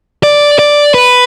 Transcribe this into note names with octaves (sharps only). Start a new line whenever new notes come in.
D5
D5
B4